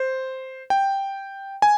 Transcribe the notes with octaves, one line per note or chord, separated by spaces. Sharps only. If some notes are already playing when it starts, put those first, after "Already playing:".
Already playing: C5
G5
G#5